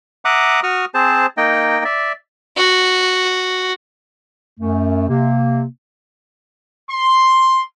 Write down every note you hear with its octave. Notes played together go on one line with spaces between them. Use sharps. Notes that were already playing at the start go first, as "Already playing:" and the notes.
E5 F#5 A#5 D6 D#6 F#6
F#4 C#6 D#6 F6
C4 G#4 C5 A5
A#3 D#4 D#5 G5
D5 E5
F#4
F#2 A3
C3 A#3
C6